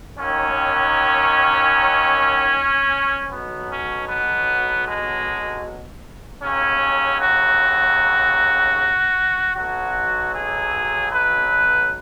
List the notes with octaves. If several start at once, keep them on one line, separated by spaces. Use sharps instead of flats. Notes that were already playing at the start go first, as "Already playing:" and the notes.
D#2 D#3 F#3 C#4
B1 B2 F#3 B3
C#4
B3
G#3
D#2 C#3 F#3 C#4
F#4
B1 B2 F#3 F#4
G#4
B4